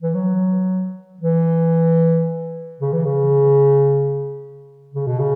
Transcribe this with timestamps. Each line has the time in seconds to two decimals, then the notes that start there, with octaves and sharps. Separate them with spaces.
0.02 E3
0.15 F#3
1.21 E3
2.80 C#3
2.92 E3
3.05 C#3
4.94 C#3
5.07 B2
5.20 C#3